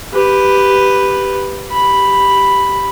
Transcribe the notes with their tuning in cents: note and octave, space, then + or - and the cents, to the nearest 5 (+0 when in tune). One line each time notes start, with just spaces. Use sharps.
G4 +0 B4 +0
G4 +0 B5 +0